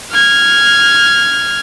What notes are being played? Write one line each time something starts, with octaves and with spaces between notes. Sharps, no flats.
F6 G#6